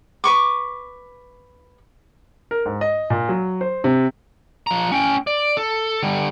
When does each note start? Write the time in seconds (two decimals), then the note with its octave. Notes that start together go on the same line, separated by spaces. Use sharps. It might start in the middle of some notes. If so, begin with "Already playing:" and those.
0.24 B4 C#6 D6
2.51 A#4
2.66 G#2
2.81 D#5
3.10 A#2
3.29 F#3
3.61 C5
3.84 C3
4.67 F3 A#5
4.92 C#4 G5
5.27 D5
5.57 A4
6.03 D3 G3